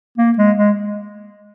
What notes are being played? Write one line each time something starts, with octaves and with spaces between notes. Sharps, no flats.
A#3
G#3
G#3